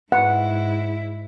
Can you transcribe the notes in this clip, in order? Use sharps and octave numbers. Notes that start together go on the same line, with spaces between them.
G#2 E4 F#5